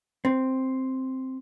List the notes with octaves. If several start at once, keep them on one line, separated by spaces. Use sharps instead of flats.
C4